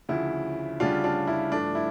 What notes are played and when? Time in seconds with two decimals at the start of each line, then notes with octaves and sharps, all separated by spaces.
0.09 D2 C#3 F3 E4
0.80 D2 C#3 G3 D4 F4
1.04 D4 F4
1.27 E4
1.51 G2 F3 A3 D4
1.75 E4